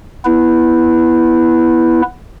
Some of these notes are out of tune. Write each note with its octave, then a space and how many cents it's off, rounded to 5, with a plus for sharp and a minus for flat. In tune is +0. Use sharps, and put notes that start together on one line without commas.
B3 -10 E4 +0 B4 +0